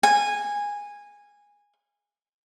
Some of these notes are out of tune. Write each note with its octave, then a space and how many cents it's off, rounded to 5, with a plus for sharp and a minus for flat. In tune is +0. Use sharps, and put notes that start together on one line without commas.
G#5 -15